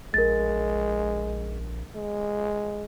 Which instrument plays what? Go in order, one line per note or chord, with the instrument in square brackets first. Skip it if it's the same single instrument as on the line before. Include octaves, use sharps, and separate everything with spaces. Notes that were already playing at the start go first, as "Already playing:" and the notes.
[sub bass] A#1 [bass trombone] G#3 [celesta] A#4 A6
[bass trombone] G#3